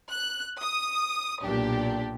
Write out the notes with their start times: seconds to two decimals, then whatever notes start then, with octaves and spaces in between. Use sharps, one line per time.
0.10 F#6
0.61 D#6
1.42 B1 A#2 D4 G4